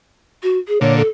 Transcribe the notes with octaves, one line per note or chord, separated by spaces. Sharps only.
F#4
G#4
A#2 D3 C#5
A4